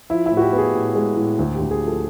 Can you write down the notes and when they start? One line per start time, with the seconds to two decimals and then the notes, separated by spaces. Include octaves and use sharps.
0.10 F3 E4
0.26 E4
0.31 A2
0.37 F#4
0.41 G4
0.53 B3
0.58 G#4
0.74 A2
0.95 G#3
1.17 A2
1.39 D2
1.55 G4
1.60 D2
1.71 G#4
1.82 F3
1.87 A4